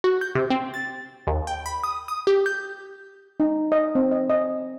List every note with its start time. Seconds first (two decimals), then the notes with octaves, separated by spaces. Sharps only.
0.04 F#4
0.21 G6
0.35 C3
0.50 C4
0.74 A6
1.27 D#2
1.47 G5
1.66 B5
1.83 D#6
2.08 D#6
2.27 G4
2.46 G6
3.40 D#4
3.72 D#5
3.95 C4
4.11 D#5
4.30 D#5